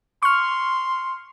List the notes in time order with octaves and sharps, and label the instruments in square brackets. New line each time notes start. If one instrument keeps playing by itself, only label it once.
[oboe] C6 [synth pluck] C#6 F6